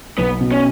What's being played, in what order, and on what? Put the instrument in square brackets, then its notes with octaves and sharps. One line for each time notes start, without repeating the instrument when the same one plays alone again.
[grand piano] B1 [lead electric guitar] B3
[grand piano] B2
[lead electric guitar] C#4